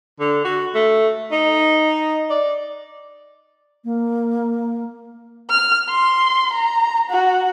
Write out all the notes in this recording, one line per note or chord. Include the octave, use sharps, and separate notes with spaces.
D3
F#4
A3
D#4
D5
A#3
F6
C6
A#5
F#4